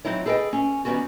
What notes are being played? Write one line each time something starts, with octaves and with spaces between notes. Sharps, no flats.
F#3 A#3 C4 D#4 E4 C#5
G#4 A4 B4 D5 D#5 G5
C#4
D#3 F#3 G3 B3 C#4 F#4